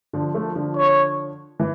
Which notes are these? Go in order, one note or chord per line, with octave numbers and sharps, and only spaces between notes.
D3 F3
F3 A3
D3 F3
C#5
E3